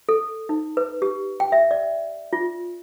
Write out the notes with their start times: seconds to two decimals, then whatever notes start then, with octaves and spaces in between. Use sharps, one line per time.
0.09 A4
0.49 D#4
0.77 B4
1.02 G4
1.40 G5
1.52 E5
1.71 D5
2.33 F4